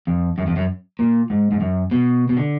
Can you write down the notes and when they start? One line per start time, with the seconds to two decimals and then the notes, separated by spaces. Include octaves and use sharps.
0.07 F2
0.38 F#2
0.47 F2
0.56 F#2
0.99 A#2
1.30 G#2
1.52 G#2
1.61 F#2
1.91 B2
2.29 B2
2.37 D3